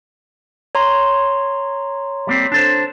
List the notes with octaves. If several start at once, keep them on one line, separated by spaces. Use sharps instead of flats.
C#5 A#5 C6
G3 A#3 C4
D4 A4 C5